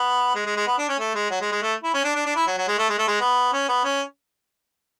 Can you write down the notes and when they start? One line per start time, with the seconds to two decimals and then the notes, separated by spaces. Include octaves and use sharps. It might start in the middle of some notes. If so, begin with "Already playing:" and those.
Already playing: B3
0.35 G#3
0.46 G#3
0.57 G#3
0.67 B3
0.78 D4
0.89 C#4
0.99 A3
1.15 G#3
1.31 F#3
1.41 G#3
1.52 G#3
1.62 A3
1.84 E4
1.94 C#4
2.05 D4
2.15 D4
2.26 D4
2.36 E4
2.47 F#3
2.58 F#3
2.68 G#3
2.79 A3
2.89 G#3
2.99 A3
3.08 G#3
3.20 B3
3.53 C#4
3.69 B3
3.84 C#4